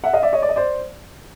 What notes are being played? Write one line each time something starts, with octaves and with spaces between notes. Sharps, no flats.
E5 F#5
D#5 F5
D5 E5
C#5 D#5
D5
D#5
C5 D5